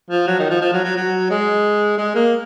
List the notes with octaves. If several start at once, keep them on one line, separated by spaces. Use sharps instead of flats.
F3
F#3
D#3
F3
F3
F#3
F#3
F#3
G#3
G#3
A#3